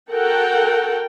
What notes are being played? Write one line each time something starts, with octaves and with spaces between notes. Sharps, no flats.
F#4 A4 A#4 F#5 G5